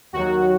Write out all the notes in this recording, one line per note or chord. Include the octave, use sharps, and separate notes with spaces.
D#2 D#3 F#3 F#4